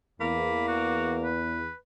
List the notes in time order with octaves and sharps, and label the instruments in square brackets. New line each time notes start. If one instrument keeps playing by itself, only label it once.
[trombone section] E2 [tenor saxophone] A#3 [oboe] B5
[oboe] F#4
B4